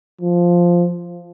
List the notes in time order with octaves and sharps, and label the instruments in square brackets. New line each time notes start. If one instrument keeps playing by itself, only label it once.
[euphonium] F3